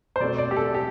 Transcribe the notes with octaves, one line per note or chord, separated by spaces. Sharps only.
C5
B2 A3 C4 D5
D5
G4
A4
G4